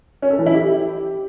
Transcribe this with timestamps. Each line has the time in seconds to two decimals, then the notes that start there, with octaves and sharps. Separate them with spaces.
0.22 C#4
0.30 A4
0.38 E3
0.46 E4
0.54 G4